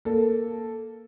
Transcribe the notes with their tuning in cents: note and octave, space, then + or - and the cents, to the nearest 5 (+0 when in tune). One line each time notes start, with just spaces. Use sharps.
A#3 +0 A4 +0